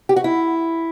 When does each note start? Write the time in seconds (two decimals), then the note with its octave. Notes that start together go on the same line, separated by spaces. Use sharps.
0.09 G4
0.16 F#4
0.24 E4